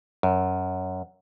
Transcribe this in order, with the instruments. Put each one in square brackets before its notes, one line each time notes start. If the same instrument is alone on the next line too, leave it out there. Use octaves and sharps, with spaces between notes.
[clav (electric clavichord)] F#2